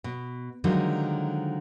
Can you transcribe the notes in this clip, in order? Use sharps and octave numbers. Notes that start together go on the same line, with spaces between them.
B2
D3 D#3 F3 F#3 G#3